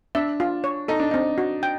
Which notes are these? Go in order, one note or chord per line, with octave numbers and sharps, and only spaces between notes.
D4 E5
F4
C#5
D#4 A4
D4
C4 D#4
F#4
G5